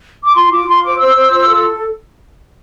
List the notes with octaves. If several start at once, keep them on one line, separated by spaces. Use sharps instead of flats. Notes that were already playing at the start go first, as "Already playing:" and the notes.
D6
F4 C6
F4 D6
F4 C6
C5 D6
C5 E6
C5
F4
A4